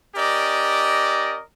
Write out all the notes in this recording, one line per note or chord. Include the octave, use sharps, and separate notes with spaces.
C#4 G4 A#4 D5 D#5